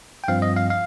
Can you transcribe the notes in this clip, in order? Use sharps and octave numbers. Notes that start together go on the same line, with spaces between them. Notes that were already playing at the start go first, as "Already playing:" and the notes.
G5
G2 F3 C4 F5
D#5
F5
F5